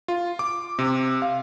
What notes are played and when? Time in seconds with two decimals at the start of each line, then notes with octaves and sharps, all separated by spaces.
0.08 F4
0.39 D6
0.79 C3
1.22 F5